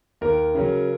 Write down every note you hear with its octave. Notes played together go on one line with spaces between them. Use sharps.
D#2 A#4
C#3 F#3